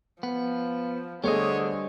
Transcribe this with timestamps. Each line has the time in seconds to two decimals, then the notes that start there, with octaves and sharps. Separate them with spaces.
0.23 F3 B3
1.24 D3 G3 A3 G#4 C5 C#5 D#5